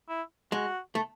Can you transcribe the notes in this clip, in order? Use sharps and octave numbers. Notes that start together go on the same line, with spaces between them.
E4
G#3 F#4
A3